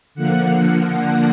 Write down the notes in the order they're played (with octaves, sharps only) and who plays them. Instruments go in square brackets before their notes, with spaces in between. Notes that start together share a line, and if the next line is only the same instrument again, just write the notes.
[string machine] D3 F3 A#3 F#5